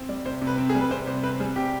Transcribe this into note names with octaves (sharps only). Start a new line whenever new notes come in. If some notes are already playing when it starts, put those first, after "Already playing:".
Already playing: C4
G3 D5
C3 C5
C3
B4
C4
G#4
G3
B4
C3 C5
C3 C5
C4 B4
G3 G#4
C3 G4